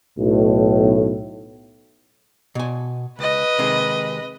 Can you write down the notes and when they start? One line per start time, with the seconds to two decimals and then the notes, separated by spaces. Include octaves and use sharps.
0.18 B1 A2
2.55 B2 G#5
3.19 C#2 B4 D#5
3.59 C3 D#3 G#3